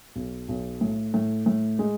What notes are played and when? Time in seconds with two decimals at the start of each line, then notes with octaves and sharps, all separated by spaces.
0.16 B1
0.49 B1
0.81 A2
1.14 A2
1.46 A2
1.79 G#3